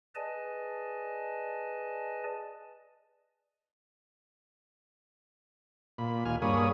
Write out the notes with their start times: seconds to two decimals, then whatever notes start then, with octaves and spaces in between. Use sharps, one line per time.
0.15 G#4 B4 D5 D#5 G#5 A5
5.98 A#2 B5
6.25 D#2 A#2 G#5 F6
6.42 G2 A#3 G#4 C#5 B5 D#6